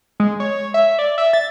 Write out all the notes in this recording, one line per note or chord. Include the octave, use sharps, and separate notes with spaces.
G#3
C#5
E5
D5
E5
A6